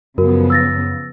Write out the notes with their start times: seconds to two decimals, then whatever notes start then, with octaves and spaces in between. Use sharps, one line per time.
0.18 F#2 C#3 F3 B3 F#4 A#4
0.50 E6 A6 A#6